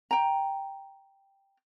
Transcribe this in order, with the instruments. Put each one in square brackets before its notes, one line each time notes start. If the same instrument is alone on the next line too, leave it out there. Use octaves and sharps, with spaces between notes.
[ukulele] G5 A#5